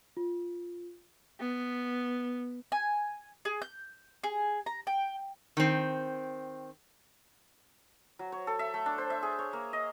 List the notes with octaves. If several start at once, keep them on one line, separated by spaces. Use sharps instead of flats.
F4
B3
G#5
G#4
G6
G#4
A#5
G5
D#3 C4
F#3
C#5
A4
E5
A3
D4
C5
E5
G#4
C#5
A#3
D#5